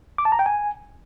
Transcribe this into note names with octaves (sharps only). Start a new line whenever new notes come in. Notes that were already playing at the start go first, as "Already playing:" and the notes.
D6
A5
A#5
G5
G#5